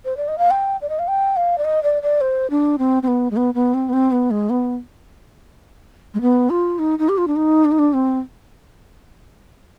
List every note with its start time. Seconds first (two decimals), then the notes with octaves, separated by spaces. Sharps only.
0.05 C5
0.17 D5
0.28 D#5
0.38 F5
0.51 G5
0.81 D5
0.89 D#5
0.99 F5
1.08 G5
1.36 F5
1.58 D5
1.65 D#5
1.83 D5
2.02 D5
2.21 C5
2.50 D4
2.78 C4
3.03 C4
3.07 B3
3.31 G#3
3.37 B3
3.54 B3
3.74 C4
3.89 B3
3.93 C4
4.12 B3
4.31 G#3
4.50 B3
6.14 G#3
6.21 B3
6.50 F4
6.79 D#4
6.99 D#4
7.09 G4
7.18 F4
7.28 D4
7.36 D#4
7.65 D4
7.72 D#4
7.79 D4
7.93 C4